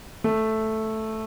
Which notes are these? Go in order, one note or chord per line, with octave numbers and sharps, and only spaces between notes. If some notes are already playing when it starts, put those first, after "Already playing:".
A3